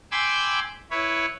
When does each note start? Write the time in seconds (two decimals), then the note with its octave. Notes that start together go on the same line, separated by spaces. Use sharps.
0.12 G5 G#5 B5 C6 D6 E6
0.91 E4 B4 C#5